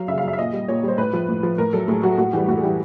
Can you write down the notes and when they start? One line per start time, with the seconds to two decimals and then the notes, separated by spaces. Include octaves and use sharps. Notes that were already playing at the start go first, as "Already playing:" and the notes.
Already playing: F#3 F5
0.08 C#3 E5
0.18 F5
0.23 F#3 E5
0.33 E5
0.38 A#2 D#5
0.53 G3
0.68 A#2 C#5
0.83 G3 C5
0.98 A2 B4
1.13 F3
1.29 A2
1.43 F3
1.58 A2 A#4
1.73 F#3 A4
1.88 A2 G#4
2.03 F#3 F#4
2.18 A2 F#4
2.33 E3 G3 G4
2.48 A2 F#4
2.58 G#4
2.63 E3 G3 G4